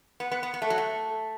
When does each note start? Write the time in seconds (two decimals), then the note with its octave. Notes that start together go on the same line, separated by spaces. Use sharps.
0.20 B3
0.32 B3
0.43 B3
0.54 B3
0.62 A3
0.65 A4
0.70 F#3
0.78 A3